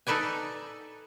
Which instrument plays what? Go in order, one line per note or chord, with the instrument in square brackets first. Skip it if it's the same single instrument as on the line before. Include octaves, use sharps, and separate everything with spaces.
[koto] D#4 A4 B4 D5 G#5